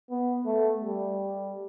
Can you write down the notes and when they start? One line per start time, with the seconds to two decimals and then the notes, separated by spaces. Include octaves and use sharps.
0.10 B3
0.45 A3
0.81 G3